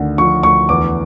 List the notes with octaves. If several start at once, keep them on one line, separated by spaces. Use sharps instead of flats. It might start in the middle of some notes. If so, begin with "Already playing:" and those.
Already playing: D2 D3 D#3
F3 C#6
D2 C#6
E2 D6